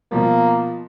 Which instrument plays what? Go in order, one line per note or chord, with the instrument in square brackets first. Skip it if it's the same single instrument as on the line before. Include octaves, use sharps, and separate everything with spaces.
[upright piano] B2 F3 [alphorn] A#3